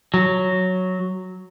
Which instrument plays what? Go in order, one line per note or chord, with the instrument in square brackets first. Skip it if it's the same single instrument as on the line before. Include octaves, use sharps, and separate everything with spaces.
[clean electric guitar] F#3